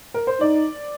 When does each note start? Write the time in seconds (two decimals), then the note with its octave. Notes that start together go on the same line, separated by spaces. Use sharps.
0.14 A#4
0.27 C5
0.41 D#4 D5